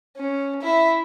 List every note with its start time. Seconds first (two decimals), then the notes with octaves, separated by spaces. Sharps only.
0.17 C#4
0.62 E4 E5